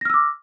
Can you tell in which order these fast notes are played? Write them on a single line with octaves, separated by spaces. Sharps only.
A#6 F6 E6 D6